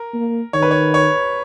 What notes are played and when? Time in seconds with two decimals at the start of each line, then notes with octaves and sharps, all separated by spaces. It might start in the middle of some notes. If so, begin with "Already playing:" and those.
Already playing: A#4
0.14 A#3
0.53 D#3 C#5
0.62 B4
0.71 C#5
0.94 C#5